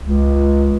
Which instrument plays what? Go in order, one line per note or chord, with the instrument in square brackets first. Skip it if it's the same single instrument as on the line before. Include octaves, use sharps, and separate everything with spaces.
[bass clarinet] C#2